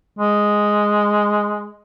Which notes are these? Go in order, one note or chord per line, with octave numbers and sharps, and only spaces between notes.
G#3